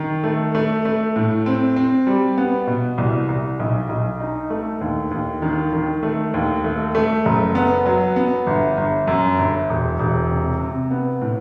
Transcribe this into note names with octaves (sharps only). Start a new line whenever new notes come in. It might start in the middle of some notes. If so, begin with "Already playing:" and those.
Already playing: D#3
A3
A3
A3
A2
C4
C4
G3
B3
B2
C2
C2
B1
B1
D#4
A3
D#2
D#2
D#3
D#3
A3
D#2
A3
A3
F#1
B3
F#3
B3
G1
G1
F#2
G1
E1
E1
C3
C3
B3
A2